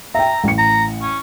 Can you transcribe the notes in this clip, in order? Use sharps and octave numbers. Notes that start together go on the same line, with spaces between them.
E5 G5 A#5
A1 C#7
A#5
C#4